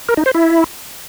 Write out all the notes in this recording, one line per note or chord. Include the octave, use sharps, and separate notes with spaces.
A#4
D#4
C5
E4